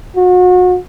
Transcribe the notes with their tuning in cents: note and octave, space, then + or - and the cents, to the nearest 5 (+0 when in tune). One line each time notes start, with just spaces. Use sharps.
F#4 -35